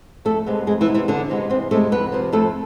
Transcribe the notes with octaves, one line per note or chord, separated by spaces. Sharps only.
F2 A3 A4
C3 G#3 B3
F2 G#3 G#4
E3 E4
C3 G#3 B3
E3 E4
E2 D3 D4
C3 G#3 B3
E2 C4
C3 G#3 A3 B3 A4
F2 B3 B4
C3 F3
F2 A3 A4